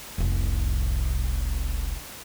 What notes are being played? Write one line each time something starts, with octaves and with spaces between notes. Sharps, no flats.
F1 C2